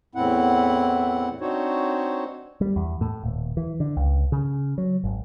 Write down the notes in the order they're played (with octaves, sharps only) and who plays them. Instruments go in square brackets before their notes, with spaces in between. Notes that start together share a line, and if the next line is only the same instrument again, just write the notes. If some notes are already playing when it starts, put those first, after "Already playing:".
[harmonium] E2 A2 C4 E4 F#5
C4 D4 D#4 F#4 C5 C#5
[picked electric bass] G3
E2
A2
D#1
E3
D3
C#2
C#3
F#3
G#1